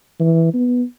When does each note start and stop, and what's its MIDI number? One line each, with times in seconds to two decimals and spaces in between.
0.20 0.52 52
0.54 0.83 59